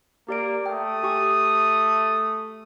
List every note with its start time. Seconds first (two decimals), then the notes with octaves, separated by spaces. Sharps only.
0.29 A#3 G4 D5 D7
0.66 A3 G5 D#6
1.03 G4 G#5 C#6